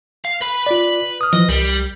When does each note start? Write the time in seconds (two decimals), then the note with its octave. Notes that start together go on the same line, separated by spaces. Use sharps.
0.25 F5
0.41 B4 B5
0.67 F4 D5
1.21 D#6 F6
1.33 E3 F3 D#5
1.49 C2 G3